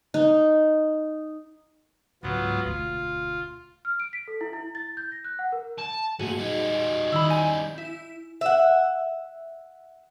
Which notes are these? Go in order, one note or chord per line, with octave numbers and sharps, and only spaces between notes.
D#4
C#2 G#2 F#3 B3 F4
E1 D2 F4
F6
D7
B6
A4
E4
E4
A6
G6
A#6
F#6
F#5
A#4
A5
A#2 A3 F#4 G#4
G3 D#4
D#3 E4 B5 E6
G#5 G6
E4
E5 F#5